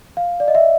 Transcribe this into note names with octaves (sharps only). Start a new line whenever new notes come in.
F5
D5
D#5
E5